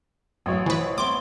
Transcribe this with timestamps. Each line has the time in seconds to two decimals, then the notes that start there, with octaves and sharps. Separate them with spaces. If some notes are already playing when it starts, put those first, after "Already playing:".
0.46 A1 F#3 A3 B3 C#5
0.66 B2 E3 B4 C5
0.98 B3 C4 E4 C6 D6